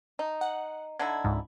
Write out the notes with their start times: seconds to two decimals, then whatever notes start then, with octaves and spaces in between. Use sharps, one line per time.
0.19 D#4
0.41 F#5
0.99 D3 D#4 E4 G#6
1.24 C#2 G#2